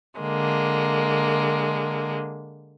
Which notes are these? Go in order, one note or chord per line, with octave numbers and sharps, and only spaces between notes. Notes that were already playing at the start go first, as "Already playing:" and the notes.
D3 G#3 A#3